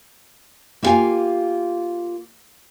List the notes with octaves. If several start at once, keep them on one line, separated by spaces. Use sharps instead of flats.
A#3 E4 F4 G4 F5 G#5